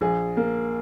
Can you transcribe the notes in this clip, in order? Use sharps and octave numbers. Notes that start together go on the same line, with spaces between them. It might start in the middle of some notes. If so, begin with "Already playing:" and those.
A#1 G#4
A#3